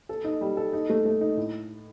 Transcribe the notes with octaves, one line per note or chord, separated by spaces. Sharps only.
A4
D#4
G3
A4
D#4
A3
A3
D#4
A2